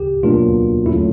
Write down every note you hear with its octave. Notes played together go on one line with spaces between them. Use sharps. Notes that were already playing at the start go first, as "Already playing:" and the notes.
Already playing: G4
B2 F#3 A#3 D4 F4
D3 F#3 A3 C#4 E4 F4